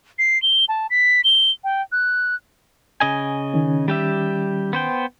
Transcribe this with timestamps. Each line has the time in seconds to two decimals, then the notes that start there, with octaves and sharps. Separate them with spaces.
0.19 C7
0.42 G7
0.69 A5
0.90 B6
1.24 G7
1.64 G5
1.92 F#6
3.00 C#3 D#5 G#5
3.54 D#3 C#4
3.88 G3 G4 E5
4.73 B3 C5 G5